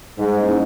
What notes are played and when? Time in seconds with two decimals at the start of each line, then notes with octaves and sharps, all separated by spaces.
0.19 G#2 G3
0.39 A#3 C#4 E4